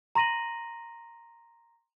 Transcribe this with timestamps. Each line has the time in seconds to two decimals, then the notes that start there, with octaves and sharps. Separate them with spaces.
0.15 A#5 C6 A#6 D#7 F#7